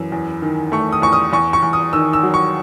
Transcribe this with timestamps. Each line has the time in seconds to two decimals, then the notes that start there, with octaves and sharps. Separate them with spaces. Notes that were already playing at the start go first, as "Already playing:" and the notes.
Already playing: F#2 E3
0.12 E2
0.42 D#3
0.72 A3 C#6
0.92 D#6
1.02 E2 C#6
1.13 D#6
1.33 E2 C#6
1.53 C#6
1.62 E2
1.73 D#6
1.93 D#3 E6
2.13 E6
2.23 F#3
2.34 C#6